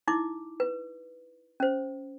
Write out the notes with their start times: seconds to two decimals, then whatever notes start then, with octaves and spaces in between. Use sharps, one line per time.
0.08 D#4 E4 D6
0.60 B4
1.60 C#4 C5